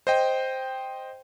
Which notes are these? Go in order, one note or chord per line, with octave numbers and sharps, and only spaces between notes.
C5 D#5 G5